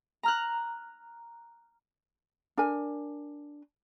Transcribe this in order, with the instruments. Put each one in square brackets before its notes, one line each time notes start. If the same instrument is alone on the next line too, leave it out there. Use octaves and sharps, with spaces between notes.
[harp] A#5 F6 F#6
[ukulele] D4 A#4 G#5